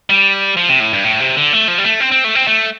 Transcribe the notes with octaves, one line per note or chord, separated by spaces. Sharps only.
G3
F3
C3
A2
G2
A2
C3
D3
A3
F3
G3
A3
C4
C4
A3
C4
A3